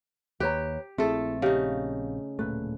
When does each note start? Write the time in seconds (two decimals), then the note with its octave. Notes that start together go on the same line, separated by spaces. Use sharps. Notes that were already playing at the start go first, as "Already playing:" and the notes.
0.40 D#2 G4 B4 C#5 A#5
0.98 A#1 A3 C4 E4 G#4 A4
1.42 C#3 D#4 G4 F5
2.39 D1 A#2 A3 B4